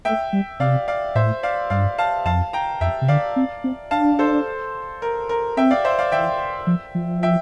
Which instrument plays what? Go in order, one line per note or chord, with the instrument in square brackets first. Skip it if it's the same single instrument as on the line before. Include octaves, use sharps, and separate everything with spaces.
[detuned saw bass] A3 [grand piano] E5 G5
[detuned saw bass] G3
[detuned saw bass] C3 [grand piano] D5 F5
[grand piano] D5 F5
[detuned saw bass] A2 [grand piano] C5 E5
[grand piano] D5 F5
[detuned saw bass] G2 [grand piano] D5 F5
[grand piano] F5 A5
[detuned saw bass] F2 [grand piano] F5 A5
[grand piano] G5 A#5
[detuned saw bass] F2 [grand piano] E5 G5
[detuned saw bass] C3
[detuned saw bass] D3 [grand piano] D5 F5
[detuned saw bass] C4
C4
[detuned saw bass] D4 [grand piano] F5 A5
[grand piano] A4 C5
A#4
A#4
[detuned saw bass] C4 [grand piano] E5 G5
[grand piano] D5 F5
C5 E5
D5 F5
[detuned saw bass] E3 [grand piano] E5 G5
[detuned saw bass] F3
F3
[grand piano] E5 G5